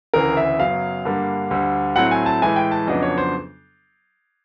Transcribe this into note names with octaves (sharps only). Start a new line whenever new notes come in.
D2 C#3 E3 A#4
E5
F#2 C#3 F#3 B3 F5
G2 D3 G3 A#3
D2 D3 G3
A2 F#3 A3 C4 F#5
G#5
A5
A2 E3 G#3 G#5
G5
A5
F2 C#3 F#3 B3 D4 D#5
C#5
C5